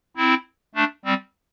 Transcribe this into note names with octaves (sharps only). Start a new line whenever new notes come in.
C4 E4
A3 D4
G3 C4